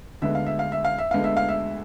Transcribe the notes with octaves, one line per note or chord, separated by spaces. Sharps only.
D2 D3 G#3 B3 E5
F5
E5
F5
E5
F5
E5
D2 D3 G#3 B3 F5
E5
F5
E5